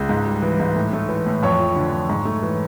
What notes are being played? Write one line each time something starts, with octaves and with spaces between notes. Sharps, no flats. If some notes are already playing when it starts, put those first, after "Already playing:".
Already playing: C#2
G#2
G3
E3
G#2
A2
A3
E3
A2
F2 C#5
F3
D3
F2
G#2
A3
E3